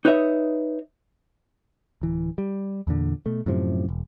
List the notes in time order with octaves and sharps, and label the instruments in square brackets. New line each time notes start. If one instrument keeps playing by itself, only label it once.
[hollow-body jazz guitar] D#4 B4 C#5 D#5 E5
[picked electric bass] D1 E3
G3
E2 A#2 D3
B2 A3
F#2 A2 C3 F3
E1